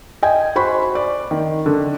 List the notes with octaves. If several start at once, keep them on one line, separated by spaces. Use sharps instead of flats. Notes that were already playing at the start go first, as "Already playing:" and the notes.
D#5 G5 G#5
F#4 C5 B5
D5
D#3
D3